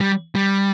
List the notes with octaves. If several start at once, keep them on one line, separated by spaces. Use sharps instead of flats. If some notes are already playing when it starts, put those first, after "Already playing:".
G3
G3